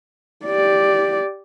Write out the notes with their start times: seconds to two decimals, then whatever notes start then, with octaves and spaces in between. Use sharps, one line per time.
0.46 G4 D5